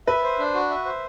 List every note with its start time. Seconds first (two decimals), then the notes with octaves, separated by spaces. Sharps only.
0.07 B4 E5
0.24 C5
0.39 D4
0.54 F#4
0.70 E5
0.85 C5